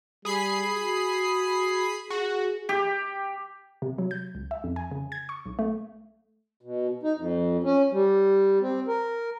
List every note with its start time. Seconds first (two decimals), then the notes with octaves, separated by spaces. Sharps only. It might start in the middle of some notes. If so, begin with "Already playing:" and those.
0.25 G3 G#4 B5 C7
0.74 F#4
2.10 F#4 G#4
2.69 G4
3.82 C3
3.98 F#3
4.11 G6
4.35 C#2
4.51 E5
4.64 F2
4.76 G#5
4.91 C#3
5.12 G#6
5.29 C#6
5.46 B1
5.59 A3
6.61 B2
7.03 D#4
7.17 F2
7.64 C#4
7.91 G3
8.61 C4
8.88 A#4